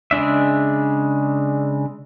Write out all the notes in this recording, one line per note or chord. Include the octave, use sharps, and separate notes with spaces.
C#3 G#3 D4 E5